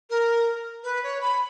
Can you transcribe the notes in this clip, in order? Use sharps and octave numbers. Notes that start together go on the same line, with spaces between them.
A#4
B4
C#5
B5